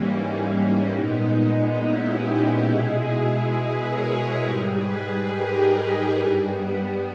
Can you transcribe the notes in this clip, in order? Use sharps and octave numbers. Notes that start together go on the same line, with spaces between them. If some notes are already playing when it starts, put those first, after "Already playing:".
Already playing: G#2 E3 G3 A#3 C#4
A#2 G#3 B3 D#4
C#4 E4
D#4 G4
D#4 G4
B2 G#3 E4 G#4
G#4 B4
A#4 C#5
G#2 G3 G4 A#4
G#4 B4
G#4 B4
G4 A#4
D#4 G4
G2 G3 C#4 E4
B3
B3